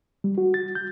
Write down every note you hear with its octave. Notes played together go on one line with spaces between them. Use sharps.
G3
F#4
A6
G6